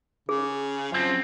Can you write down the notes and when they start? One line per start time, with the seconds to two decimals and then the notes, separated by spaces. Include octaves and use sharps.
0.29 C#3 G#4
0.92 F#2 F3 C4